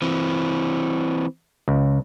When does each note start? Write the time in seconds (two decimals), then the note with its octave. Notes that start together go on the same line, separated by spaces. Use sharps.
0.02 E3 C4
1.68 C#2